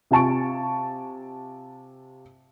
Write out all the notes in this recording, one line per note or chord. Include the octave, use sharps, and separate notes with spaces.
C3 F4 G#5 A5 C#6 D7